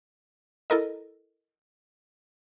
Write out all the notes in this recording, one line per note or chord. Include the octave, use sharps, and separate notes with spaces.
E4 A4 A#4 D#5